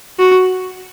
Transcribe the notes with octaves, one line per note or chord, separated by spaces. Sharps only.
F#4